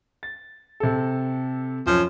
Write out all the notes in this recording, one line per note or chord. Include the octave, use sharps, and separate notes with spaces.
A6
C3 A4
F#2 F3 C#5